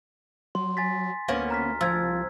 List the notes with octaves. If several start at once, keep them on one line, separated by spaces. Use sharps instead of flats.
F#3 C6
G#5 A6 B6
D2 A#3 B3 C#4
A#5 F6 B6
F3 E6 G#6
C2